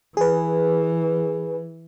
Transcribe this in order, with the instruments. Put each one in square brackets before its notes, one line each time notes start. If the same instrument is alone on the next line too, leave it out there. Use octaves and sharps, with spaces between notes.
[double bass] E3 [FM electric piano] G#4 B4